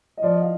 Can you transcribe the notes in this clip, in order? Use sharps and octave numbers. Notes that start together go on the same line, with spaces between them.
D#5
F3 D5
D#5
F5